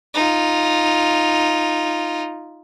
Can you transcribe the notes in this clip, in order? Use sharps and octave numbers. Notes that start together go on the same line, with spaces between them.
D#4 F4